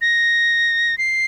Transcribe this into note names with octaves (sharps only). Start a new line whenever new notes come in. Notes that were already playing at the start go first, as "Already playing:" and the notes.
A#6
C7